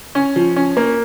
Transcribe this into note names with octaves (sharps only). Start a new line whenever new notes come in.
C#4
F3
C#4
A#3